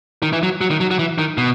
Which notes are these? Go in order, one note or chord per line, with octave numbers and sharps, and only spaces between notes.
D#3
E3
F#3
F#3
D#3
F#3
F#3
E3
D#3
B2